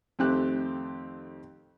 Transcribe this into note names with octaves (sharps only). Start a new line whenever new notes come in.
F2 D#3 A3 C4 G4 F#6